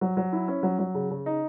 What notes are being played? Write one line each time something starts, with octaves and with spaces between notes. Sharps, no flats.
F#3
F#3
E4
C#4
F#3
F#3
C#3
C#3
D#4